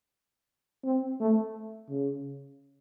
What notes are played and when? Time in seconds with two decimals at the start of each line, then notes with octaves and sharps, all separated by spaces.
0.85 C4
1.20 A3
1.89 C#3